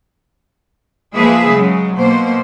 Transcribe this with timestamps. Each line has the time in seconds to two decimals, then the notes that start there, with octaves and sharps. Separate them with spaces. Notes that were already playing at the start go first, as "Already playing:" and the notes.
1.16 F3 G#3 A#3 G#4 B4 E5
1.50 C#3 F#3 G#3
1.96 B2 A#3 C5